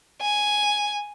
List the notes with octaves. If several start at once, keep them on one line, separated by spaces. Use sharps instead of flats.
G#5